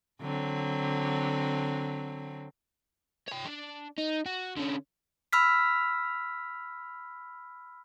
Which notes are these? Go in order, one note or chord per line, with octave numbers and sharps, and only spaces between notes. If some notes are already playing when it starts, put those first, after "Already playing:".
D3 F#3 C4
C#5 G5
D4
D#4
F#4
D3 C#4
B5 E6 F6 B6